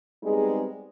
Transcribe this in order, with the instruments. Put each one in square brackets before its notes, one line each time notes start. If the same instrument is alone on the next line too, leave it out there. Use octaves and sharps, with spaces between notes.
[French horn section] G3 G#3 B3 C4 D#4 G#4